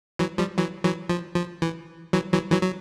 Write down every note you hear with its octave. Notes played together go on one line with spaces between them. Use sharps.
E3 F#3
F3 G3
E3 F#3
E3 F#3
F3
F3
E3
E3 F#3
E3 F#3
E3 F#3
F#3